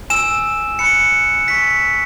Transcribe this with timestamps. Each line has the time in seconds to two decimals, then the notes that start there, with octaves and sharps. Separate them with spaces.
0.10 G#5 E6 E7
0.79 G#5 B5 F#6 C#7
1.48 G#5 C#6 E6 B6